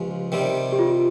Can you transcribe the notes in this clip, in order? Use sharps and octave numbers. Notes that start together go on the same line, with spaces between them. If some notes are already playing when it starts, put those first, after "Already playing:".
Already playing: C#2 C#3 F3 G#3 G4
C3 D#3 G3 C4
G4
F4